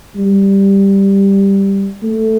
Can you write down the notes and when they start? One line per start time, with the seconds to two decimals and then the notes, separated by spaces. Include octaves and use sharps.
0.15 G3
2.03 A3